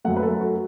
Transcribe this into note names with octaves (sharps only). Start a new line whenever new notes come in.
F#2 F#3 A3 F#5
B4
A4
F#4